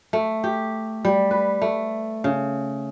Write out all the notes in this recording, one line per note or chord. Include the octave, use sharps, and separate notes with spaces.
A3
G4
G3
B4
A3
C#3